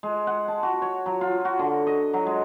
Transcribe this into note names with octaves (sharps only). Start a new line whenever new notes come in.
G#3
F#5
A5
F#4
C#5
F#3
F4
F#4
D3
D#5
F#3
G#3